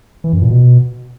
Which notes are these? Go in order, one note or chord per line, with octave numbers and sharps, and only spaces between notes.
E3
F#2
A#2
B2